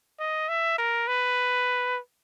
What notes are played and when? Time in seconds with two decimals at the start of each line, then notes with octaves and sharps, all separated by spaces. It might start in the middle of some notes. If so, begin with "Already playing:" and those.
0.20 D#5
0.49 E5
0.78 A#4
1.08 B4